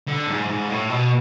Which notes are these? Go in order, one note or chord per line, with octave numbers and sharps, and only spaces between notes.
D3
G#2
G#2
A2
B2